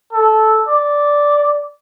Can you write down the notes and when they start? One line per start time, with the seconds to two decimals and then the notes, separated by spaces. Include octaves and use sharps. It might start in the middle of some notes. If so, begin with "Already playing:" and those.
0.13 A4
0.68 D5